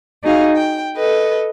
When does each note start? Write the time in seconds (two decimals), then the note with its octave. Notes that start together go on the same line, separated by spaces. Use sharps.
0.22 D#4 F#4 G#4 F5
0.55 G5
0.96 A4 B4 D#5